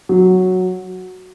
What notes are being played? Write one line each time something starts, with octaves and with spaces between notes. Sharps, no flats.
F#3